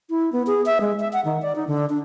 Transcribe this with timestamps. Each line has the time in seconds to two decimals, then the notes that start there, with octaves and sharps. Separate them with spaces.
0.10 E4
0.33 B3
0.47 G#4
0.66 E5
0.81 G#3
1.00 E5
1.13 F#5
1.25 D#3
1.42 D5
1.56 D#4
1.67 D3
1.90 D4